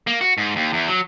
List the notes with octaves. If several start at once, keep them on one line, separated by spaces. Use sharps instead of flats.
A#3
F#4
G#2
D#2
E2
F#3